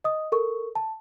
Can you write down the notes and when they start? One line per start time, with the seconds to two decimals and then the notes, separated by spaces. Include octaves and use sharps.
0.04 D#5 D#6
0.32 A4 A#4 C#6
0.75 A5